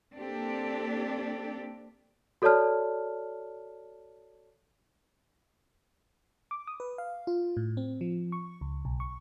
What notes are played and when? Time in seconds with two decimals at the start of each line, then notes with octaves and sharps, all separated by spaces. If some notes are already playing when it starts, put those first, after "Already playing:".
0.16 A#3 C4 D4 G4 A4
2.42 F#4 A4 C#5 D5 A5 F6
6.51 D6
6.67 D#6
6.80 B4
6.98 F5
7.27 F4
7.57 A2
7.77 C4
8.01 F3
8.32 C#6
8.61 C#2
8.85 B1
9.00 C#6